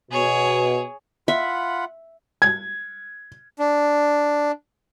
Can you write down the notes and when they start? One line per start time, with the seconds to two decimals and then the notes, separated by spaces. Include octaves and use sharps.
0.11 B2 G#4 C#5
1.28 F4 E5 F#5 B5
2.42 G#6
3.58 D4